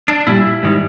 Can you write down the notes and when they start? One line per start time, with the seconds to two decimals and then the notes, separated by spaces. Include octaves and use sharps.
0.08 D4
0.27 A#2 G3 E4
0.63 G#2 D#3 G3